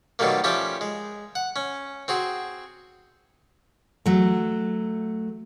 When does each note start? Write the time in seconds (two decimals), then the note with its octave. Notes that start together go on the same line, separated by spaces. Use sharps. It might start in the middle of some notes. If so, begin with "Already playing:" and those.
0.19 B2 D#3 F#3 G3 A3 A#3
0.44 F3 G3 C#4 G4 E5
0.81 G#3
1.35 F#5
1.56 C#4
2.08 C4 F#4 G#4
4.06 F#3 A3